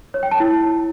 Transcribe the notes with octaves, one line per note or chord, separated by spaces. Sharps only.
C#5
G5
A5
E4